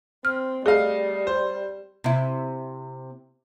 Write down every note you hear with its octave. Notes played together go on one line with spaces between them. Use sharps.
C4 F6
G3 A3 G#4 D#5 F5
C5
C3 E4